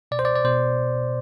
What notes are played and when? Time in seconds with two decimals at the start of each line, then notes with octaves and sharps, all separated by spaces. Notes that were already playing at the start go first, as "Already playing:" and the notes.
0.11 B2 D5
0.19 C5
0.25 D5
0.35 D5
0.44 B2 C5